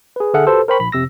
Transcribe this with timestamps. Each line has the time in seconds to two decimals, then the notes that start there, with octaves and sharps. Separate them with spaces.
0.16 G#4 B4
0.34 D3 G#4 A4 E5 F#5 F6
0.46 F#4 G4 A4 B4 C5
0.68 A#4 C5 G5 B5 C#6
0.80 A#1 B5
0.92 F2 C3 E6 A#6